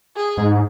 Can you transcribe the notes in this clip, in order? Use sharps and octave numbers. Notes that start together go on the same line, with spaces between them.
G#4
G#2